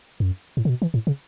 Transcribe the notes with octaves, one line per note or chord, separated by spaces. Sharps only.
F#2
A2
C#3
B2
E3
A2
C#3